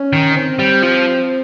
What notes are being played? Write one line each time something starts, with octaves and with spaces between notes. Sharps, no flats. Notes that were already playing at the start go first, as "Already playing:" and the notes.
Already playing: C#4
D#3
C4
G3
F3